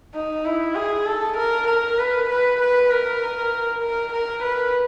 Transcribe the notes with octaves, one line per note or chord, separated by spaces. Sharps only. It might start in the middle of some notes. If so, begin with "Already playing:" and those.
D#4
E4
G#4
A4
A#4
A#4
B4
B4
B4
A#4
A#4
A#4
B4